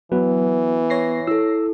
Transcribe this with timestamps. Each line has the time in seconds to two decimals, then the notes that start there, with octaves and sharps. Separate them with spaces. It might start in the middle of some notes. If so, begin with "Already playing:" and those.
0.12 E3 F#3 B3 B4
0.90 C#5 A#6 C7
1.27 E4 A4 E6